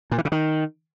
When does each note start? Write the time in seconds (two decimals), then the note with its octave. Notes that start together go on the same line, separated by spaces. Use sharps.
0.11 A#2
0.18 E3
0.25 C#3
0.32 D#3